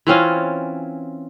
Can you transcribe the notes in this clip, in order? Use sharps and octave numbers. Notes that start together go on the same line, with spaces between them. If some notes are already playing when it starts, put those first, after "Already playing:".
E3 C4 C#4 F4